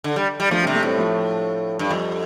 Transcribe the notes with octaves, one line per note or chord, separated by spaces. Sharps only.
D3
G3
G3
F3 A3 D4
G3 C4
C3
A3 D4
A2 G3 C4
F3 A3
G2
F2 G3